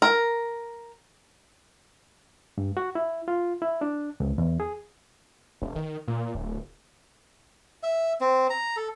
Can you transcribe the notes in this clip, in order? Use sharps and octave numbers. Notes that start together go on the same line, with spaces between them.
A#4
G2
F#4
E4
F4
E4
D4
C#2
E2
G#4
E1
D#3
A#2
D1
E5
C4
A#5
A4